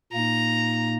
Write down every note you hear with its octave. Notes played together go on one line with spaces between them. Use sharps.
A#2 A#3 D#4 A#5